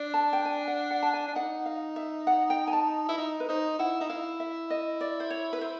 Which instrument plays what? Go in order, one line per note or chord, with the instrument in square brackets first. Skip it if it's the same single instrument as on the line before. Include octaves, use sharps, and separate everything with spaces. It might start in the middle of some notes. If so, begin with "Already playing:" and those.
Already playing: [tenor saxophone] D4
[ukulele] A5
G5
G#5
F#5
F#5
A5
G#5
[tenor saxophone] D4
[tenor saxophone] D#4 [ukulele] F#5
[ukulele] F5
E5
F#5
G5
G#5
A5
[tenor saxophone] E4
D#4
[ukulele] B4
[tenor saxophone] D#4 [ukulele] C5
[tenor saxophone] E4 [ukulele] F#5
[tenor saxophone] D#4 [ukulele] E5
[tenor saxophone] E4 [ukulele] F5
[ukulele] E5
D#5
D5
C5
C#5
B4
C5